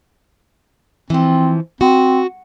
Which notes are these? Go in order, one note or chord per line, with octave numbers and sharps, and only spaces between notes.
E3 F3 C4
C4 F#4